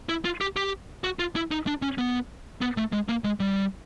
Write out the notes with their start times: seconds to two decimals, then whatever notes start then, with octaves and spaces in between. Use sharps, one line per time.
0.09 E4
0.25 F4
0.41 G4
0.56 G4
1.04 F#4
1.19 F4
1.36 E4
1.51 D#4
1.67 D4
1.82 C#4
1.98 B3
2.61 B3
2.77 A3
2.92 G#3
3.09 A#3
3.24 G#3
3.40 G3